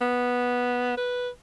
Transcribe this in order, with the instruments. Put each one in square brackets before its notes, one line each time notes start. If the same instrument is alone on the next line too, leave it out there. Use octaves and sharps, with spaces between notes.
[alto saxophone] B3
B4